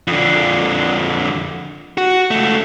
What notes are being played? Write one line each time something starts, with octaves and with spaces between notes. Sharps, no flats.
F2 D3
F#4
C#2 A3